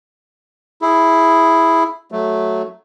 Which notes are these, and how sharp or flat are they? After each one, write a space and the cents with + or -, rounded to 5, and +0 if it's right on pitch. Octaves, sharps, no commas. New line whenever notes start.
E4 +0 G#4 +0
F#3 +5 A3 +0